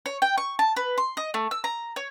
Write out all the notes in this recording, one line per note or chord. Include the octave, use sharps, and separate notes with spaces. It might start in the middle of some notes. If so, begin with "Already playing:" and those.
C#5
G5
C#6
A5
B4
C6
D#5
A3
E6
A#5
C#5